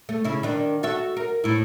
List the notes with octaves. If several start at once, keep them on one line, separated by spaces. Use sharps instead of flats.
A3
C#3 E4
D#3 D4
F#4 A4 E5
A#4
A2 E4